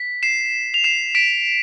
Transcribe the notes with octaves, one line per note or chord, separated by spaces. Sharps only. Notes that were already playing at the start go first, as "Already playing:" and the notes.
Already playing: B6
C7 E7
F7
C7 E7
B6 D7